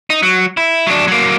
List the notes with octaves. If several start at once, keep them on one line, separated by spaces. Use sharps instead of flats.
D#4
F#3
E4
F#3 D4
F#3 A#3